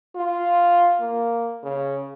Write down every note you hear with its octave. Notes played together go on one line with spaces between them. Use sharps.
F4
A#3
C#3